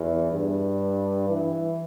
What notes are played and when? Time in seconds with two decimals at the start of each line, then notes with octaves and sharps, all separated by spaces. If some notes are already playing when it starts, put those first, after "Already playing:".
Already playing: E2
0.31 G2
1.29 E3